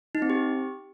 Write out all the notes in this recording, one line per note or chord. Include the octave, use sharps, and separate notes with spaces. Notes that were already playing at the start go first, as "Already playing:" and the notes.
D#4
C4
G4